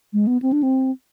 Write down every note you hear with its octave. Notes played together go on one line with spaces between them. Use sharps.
G#3
B3
C4
D4
C4